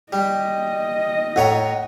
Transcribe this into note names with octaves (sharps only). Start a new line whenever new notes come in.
G3 D#5
A2 C#5 F#5 A#5